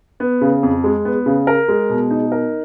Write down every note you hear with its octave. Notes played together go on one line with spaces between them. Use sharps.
B3
C#3
F2
G#3
B3
C#3
A#4
G#3
B2
D#4
A#4